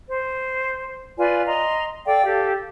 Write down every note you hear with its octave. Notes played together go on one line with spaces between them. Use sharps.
C5
F4 B4 D5 G#5
D#5 A#5 C6
A4 D5 F5 G5
G4 A4 F5